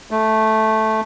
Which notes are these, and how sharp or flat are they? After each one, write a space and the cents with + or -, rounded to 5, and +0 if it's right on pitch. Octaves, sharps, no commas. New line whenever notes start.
A3 -5